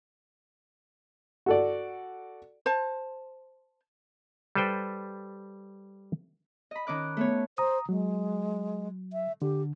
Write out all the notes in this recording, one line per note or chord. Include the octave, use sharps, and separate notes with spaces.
F#4 A4 D5
C5 A5
G3 A4 B4 C5 G5
D#5 B5
D#3 C#4 D#5 D6 F#6
A3 B3 C#5
C5 A#5 D#6
F#3 G#3
E5
D3 G4